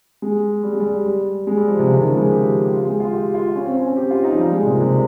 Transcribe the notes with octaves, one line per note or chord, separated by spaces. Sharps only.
G#3
G3
G#3
G3
G3
G#3
G3
F3
C3
C#3
D#3
F3
G#3
G4
G4
F4
G#3
F4
G4
F4
C#4
C4
C#4
C#4
G4
F4
D#4
F3
G3
G#3
C3
A#2
C3